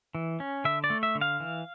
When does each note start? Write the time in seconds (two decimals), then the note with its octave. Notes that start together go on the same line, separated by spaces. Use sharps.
0.15 E3
0.40 C#4
0.65 D3 E5
0.84 D5
0.90 A3
1.03 E5
1.15 D3
1.21 F5
1.40 E3